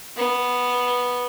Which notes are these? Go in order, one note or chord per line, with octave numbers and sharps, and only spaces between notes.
B3